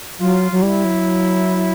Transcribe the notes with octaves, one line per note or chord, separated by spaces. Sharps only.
F#3 F4
F#3
G3 E4
F#3